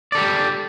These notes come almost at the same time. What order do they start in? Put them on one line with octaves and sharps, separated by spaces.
D5 A4 G4